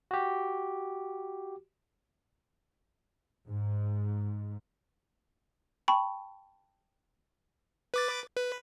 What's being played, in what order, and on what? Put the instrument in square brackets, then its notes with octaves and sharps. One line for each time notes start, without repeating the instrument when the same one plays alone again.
[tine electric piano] F#4 G4
[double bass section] G#2
[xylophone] G5 A5 B5 C#6
[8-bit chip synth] B4 D6 A6
B4